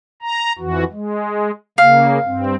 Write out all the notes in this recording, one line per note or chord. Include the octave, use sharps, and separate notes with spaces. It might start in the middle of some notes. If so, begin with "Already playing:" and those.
A#5
F2 E3 F#4
G#3
C#3 A#3 F5
G2 C4